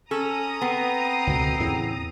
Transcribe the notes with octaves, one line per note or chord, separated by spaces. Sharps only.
C#4 A4 A#5 D#6
B3 C4
C#2 B2 D3
E2 A2 C#3